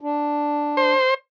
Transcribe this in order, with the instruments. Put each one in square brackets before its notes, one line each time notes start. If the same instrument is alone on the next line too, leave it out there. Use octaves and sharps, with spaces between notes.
[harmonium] D4
[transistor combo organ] C5